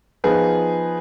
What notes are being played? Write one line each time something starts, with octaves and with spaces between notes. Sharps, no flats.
F3 B3 D#4 F4 G#4 B4